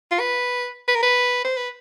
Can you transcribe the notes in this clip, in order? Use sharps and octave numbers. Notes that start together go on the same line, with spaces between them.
F4
B4
B4
A#4
B4
C5
B4